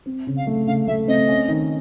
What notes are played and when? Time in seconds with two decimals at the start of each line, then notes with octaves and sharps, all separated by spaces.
0.06 C4
0.27 C#3
0.37 F5
0.47 A3
0.67 C#3 F5
0.87 A3 E5
1.08 C4 D#5
1.28 C#4
1.48 D#3